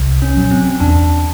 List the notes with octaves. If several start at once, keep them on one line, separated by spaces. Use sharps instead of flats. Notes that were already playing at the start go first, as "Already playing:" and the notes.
Already playing: C2
C#4
B2 F#3
C4
E2 D4